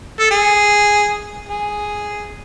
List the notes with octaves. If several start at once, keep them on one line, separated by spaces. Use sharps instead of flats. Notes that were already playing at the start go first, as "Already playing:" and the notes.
A4
G#4
G#4